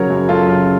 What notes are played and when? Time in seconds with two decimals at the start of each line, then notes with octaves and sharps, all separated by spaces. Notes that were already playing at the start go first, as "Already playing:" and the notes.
Already playing: C#3 F#3 A#4 C#5
0.10 F#2
0.29 F#2 F4 A4
0.49 C#3